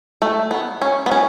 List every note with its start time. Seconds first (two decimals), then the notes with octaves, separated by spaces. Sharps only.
0.22 A3
0.51 B3
0.82 C#4
1.06 B3
1.11 C#4